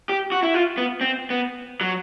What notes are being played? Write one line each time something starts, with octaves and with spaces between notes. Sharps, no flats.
G4
F#4
E4
F4
B3
C4
B3
F#3